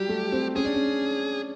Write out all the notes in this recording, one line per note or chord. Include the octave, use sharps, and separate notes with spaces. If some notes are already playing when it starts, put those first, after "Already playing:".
Already playing: F#3 G3 G4
A3
C4
C#4 G#4
D4
C#4